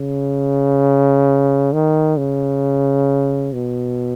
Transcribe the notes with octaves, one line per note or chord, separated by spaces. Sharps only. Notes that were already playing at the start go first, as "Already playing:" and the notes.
Already playing: C#3
D#3
C#3
B2